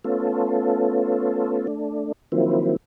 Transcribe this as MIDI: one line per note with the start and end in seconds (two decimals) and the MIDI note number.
0.04 1.67 57
0.04 1.67 59
0.04 1.67 61
0.04 1.67 65
0.04 1.67 69
1.67 2.12 57
1.67 2.12 62
2.32 2.76 51
2.32 2.76 53
2.32 2.76 54
2.32 2.76 58
2.32 2.76 60
2.32 2.76 64